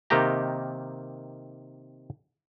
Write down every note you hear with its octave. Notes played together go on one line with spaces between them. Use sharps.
C3 D#3 A#3 D#4 G4 A#5